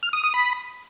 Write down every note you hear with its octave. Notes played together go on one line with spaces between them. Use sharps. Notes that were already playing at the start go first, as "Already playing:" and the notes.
F6
D#6
D#6
B5